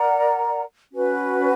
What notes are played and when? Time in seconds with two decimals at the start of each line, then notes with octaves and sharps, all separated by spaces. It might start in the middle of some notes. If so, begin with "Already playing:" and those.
Already playing: A#4 D5 F#5 A#5
0.92 C#4 F#4 B4